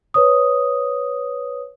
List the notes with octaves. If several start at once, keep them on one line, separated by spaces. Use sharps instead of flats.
B4 C#5 D#6